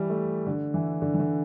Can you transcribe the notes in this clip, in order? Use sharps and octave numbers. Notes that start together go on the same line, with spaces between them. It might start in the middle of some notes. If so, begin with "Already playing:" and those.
Already playing: E3 G3
A3
D3
E3
D3
E3
D3